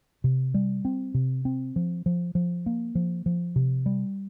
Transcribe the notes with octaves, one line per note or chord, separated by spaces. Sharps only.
C3
G3
C4
C3
C4
F3
F3
F3
A#3
F3
F3
C3
G3